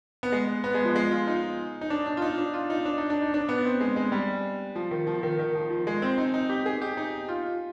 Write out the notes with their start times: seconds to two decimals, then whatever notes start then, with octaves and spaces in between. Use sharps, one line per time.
0.23 B3
0.32 G#3
0.64 B3
0.74 G#3
0.85 F3
0.96 G#3
1.11 F4
1.27 D#4
1.81 D#4
1.90 D4
2.06 D4
2.17 F4
2.22 D#4
2.38 D4
2.54 F4
2.70 D#4
2.85 D4
2.98 D#4
3.10 D4
3.22 D#4
3.34 D4
3.49 B3
3.65 C4
3.80 G#3
3.96 G#3
4.12 G3
4.76 F3
4.91 D#3
5.07 F3
5.23 D#3
5.39 D#3
5.55 F3
5.70 F3
5.87 G#3
6.02 C4
6.18 D#4
6.34 D#4
6.50 G4
6.66 G#4
6.81 G4
6.97 D#4
7.28 F4